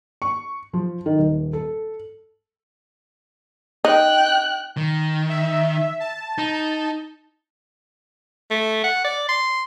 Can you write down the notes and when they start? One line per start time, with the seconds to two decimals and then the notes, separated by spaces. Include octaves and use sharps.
0.22 C#6
0.73 F3
1.06 D#3
1.18 D#1
1.53 A4
3.85 D#4 G5 F#6
4.77 D#3
5.29 E5
6.00 A5
6.38 D#4
8.51 A3
8.84 F#5
9.05 D5
9.29 C6